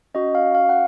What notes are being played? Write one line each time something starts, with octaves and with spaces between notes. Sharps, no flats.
C#4 F#4 D#5
F5
F5
F#5